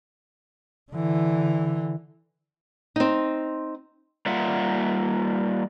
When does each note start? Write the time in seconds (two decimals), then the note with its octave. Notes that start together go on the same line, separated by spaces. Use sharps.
0.92 D3 E3
2.96 C4 D#4
4.26 G3 A#3 F4 E5 F#5